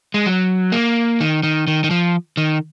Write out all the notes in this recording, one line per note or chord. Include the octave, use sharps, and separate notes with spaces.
G#3
F#3
A#3
D#3
D#3
D#3
D#3
F3
D#3